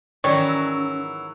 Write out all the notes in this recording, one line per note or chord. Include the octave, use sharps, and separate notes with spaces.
G#2 D#3 E3 F#3 G3 C#4 C#5